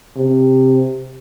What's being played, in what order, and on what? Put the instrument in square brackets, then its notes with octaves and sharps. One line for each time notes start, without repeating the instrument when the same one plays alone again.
[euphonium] C3